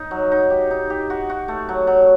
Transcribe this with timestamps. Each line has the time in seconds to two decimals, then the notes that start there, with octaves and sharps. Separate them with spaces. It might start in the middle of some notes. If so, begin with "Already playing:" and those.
Already playing: D#4
0.11 F#3
0.32 D#4
0.50 G4
0.71 D#4
0.90 G4
1.10 F#4
1.30 F#4
1.48 A3
1.69 F#3
1.87 F#3